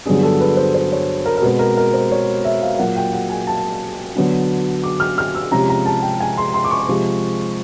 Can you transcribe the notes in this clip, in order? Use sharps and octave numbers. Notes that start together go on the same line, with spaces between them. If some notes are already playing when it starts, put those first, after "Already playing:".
G2 D3 F#3 B3 D4 G#4
A4
B4
C5
C5
C#5
A#4
A#4
B2 G#3 C4 B4
A#4
A#4
C5
C#5
E5
F5
F5
A#2 F#3 A#3 F#5
G5
F#5
G#5
A5
D3 F#3 B3 D4
D6
F6
F6
E6
C3 F3 G#3 C#4 A#5
A#5
A5
G5
G#5
C6
C6
D6
C#6
C3 F3 G#3